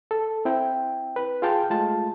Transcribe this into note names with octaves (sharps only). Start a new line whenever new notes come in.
A4
C4 E4 G5
B4
F4 G#4 F5 G5 A5 C6
G#3 A3 F4 A5